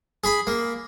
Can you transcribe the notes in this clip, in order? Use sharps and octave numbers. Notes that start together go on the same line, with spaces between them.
G#4 B5
A#3